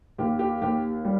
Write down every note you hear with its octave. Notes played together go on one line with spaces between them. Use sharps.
D#2 G4
G4
D#2 G4
G3